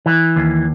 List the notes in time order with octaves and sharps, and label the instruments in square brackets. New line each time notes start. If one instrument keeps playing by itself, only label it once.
[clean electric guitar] E3
D#2